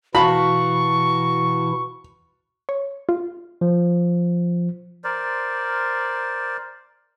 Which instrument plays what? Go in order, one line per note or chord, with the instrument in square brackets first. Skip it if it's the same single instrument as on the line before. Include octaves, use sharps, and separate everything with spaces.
[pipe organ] B2 E3 E4 [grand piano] F#4 F5 A5 [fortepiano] B5 [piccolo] C#6
[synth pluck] C#5
F4
[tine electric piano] F3
[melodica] A#4 C5 D5